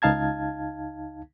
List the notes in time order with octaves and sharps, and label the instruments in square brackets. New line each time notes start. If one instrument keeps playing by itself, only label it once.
[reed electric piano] C#2 D#4 F5 A5 G#6